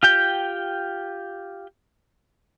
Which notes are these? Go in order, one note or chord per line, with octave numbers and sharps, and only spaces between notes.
F4 G4 G5